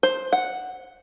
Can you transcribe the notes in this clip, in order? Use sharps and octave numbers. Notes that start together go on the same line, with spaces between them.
C5
F#5